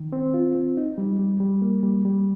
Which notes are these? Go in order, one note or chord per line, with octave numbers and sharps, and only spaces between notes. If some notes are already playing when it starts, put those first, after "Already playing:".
Already playing: D#3
C4
F4
C4
D#4
G3
G3
G3
A#3
G3
G3